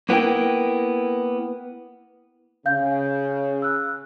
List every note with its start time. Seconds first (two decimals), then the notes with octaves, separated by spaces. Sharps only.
0.09 A#3 B3 E4 A#4 G5
2.66 C#3 F5 G6
3.62 E6 F#6